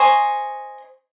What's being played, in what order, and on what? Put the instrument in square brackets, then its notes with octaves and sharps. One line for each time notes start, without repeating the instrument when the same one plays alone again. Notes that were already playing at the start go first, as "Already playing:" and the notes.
Already playing: [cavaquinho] C5 D#5 G#5 C#6